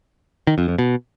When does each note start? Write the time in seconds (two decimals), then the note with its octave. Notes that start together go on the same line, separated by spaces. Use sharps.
0.47 D#3
0.58 F2
0.68 F2
0.78 B2